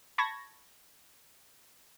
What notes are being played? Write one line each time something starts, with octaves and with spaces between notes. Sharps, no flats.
A5 B5 C#6 G#6 A#6